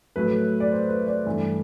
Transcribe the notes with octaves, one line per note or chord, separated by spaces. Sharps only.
A2 F#3 A3 B4
D5
C5
B4
D5
G2 E3 A3